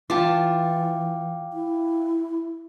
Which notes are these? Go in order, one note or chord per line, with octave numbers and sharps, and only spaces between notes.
E3 F4 F5 G5 A5 D6
E4